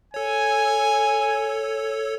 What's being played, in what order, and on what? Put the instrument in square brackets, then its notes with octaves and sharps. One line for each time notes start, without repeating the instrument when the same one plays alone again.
[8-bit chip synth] A4 C#5 [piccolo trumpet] G#5